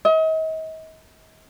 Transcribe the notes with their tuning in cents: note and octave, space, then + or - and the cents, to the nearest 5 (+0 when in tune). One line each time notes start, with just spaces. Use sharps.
D#5 +40